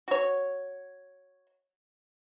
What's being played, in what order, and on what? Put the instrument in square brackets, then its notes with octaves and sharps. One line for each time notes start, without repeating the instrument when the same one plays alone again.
[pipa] F#4 C#5